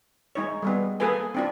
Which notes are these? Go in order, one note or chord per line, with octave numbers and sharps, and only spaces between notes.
G#3 D#4 C#5
G3 G#3 B3
A#3 G#4 A4 B4 G#5
C4 D4 F4